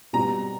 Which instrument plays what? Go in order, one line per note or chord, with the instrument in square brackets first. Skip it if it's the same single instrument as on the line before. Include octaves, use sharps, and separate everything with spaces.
[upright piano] B2 G3 C4 [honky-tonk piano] A#5